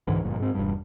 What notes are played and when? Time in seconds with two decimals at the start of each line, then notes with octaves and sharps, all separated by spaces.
0.07 C#2 G#2 D3 E3
0.24 G1 F2 A#2
0.40 G#2 C4
0.55 E1 G2